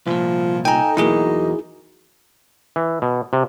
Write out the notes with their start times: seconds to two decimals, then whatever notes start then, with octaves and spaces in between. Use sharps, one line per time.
0.07 C2 A#2 F3
0.65 D#4 A4 G5 G#5 A#5
0.97 E2 B2 F#3 A#3 E4 G#4
2.76 E3
3.02 B2
3.33 C3